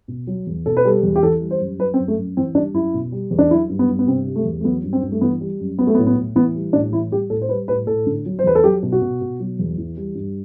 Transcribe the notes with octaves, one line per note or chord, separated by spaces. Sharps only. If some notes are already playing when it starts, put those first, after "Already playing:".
B2
F#3
E2
B2 A4
B4
G3 A4
E2
G4
E3 A4
G3
C5
F#2
F#3 B4
C4
F#2
A3
F#2
E3 C4
G3 D4
F#2 E4
B2
G3
E2
D4
F#3 E4
G2
B3
G2
B3
C3 C4
G3
A3
E2
A3
F#3 B3
G2
C4
G2
A3
E3 B3
G3
F#2
F#3 B3
A3
B3
A2
B3
A2
E3 B3
G3
A2 D4
E3 E4
G3 G4
A2 A4
C5
G3 B4
A2 B4
A2 A4
D3
F#3
C5
E2 B4
A4
F#3 G4
B2
F#4
B2
B2
F#3
E2
E3
G3
G2